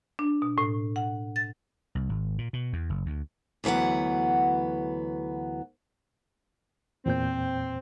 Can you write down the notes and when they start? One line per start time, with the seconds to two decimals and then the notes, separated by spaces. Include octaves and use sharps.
0.19 D4
0.42 B2
0.58 A2
0.96 F#5
1.36 A6
1.95 C2
2.09 G#1
2.38 A#2
2.53 B2
2.73 E2
2.90 F#1
3.06 D2
3.64 D2 E3 F#3 B3 F#5
7.06 E2 A#2 C4 G6